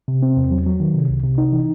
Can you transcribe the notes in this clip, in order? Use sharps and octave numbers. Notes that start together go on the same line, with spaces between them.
C3
C4
E2
F#3
F#3
D#3
C3
C2
C3
D#4
E3